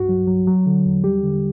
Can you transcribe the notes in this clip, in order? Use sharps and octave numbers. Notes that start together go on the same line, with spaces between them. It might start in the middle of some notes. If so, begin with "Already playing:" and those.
Already playing: C2 G2 F#4
F#3
F#3
F#3
D3
E2
G3 G4
D3